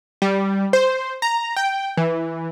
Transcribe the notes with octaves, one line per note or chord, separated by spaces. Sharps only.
G3
C5
A#5
G5
E3